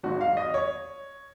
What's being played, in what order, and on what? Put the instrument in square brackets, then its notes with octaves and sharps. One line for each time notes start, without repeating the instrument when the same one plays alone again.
[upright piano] G#1 G#2 F#3 F#4
F5
D#5
C#5